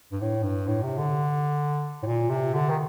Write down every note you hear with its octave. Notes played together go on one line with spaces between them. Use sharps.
G2
A2
G2
A2
C3
D3
A2
A#2
C3
D3
D#3